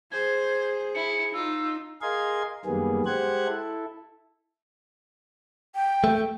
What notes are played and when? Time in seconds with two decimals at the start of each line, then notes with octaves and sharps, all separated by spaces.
0.12 G#4 C5 G#6
0.95 E4 C#7
1.34 D#4 F4 E6
2.02 G#4 A#4 D#5 F5 C6 G#6
2.65 F#2 D#3 G3 A#3 B3 G#4
3.06 G#3 G4 C5 F#5 F#6 G#6
3.47 E4 A4
5.75 G5
6.04 A3